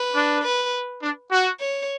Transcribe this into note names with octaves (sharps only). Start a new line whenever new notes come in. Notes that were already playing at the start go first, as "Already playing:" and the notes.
Already playing: B4
D4
B4
D4
F#4
C#5